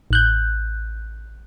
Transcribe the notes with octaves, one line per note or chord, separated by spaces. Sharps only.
A1 F#6 G6